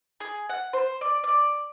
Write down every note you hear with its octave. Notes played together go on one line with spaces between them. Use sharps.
G#4
F#5
C5
D5
D5